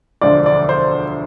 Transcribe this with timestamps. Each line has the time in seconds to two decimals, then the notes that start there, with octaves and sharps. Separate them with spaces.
0.21 E1 D2 D3 F3 D5
0.46 D5
0.69 C5